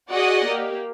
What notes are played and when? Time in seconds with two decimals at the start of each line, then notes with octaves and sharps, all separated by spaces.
0.12 F#4 G#4 D5 D#5 F#5
0.47 A#3 G4